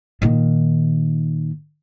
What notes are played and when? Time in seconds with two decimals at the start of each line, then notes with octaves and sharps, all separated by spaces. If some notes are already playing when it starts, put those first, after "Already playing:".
0.22 A#2 D#3